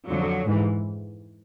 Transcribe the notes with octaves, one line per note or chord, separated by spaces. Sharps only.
F2 D3 F3 F#3
G#2 E3